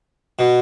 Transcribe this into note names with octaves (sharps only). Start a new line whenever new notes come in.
B2